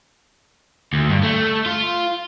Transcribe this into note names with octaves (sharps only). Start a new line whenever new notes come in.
D2
G2
A3
F4